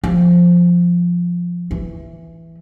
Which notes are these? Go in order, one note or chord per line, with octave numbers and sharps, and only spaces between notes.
F3
E3